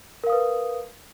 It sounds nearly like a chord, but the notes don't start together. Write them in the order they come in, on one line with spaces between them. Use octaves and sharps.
A#4 F5 D#6 B4